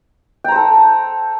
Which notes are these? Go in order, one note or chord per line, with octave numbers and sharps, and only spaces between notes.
A4 C5 G5 A#5